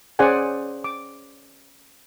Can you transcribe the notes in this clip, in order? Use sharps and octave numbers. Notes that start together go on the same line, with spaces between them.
C#4 G#4 C5 D5 F#5 G#5
D6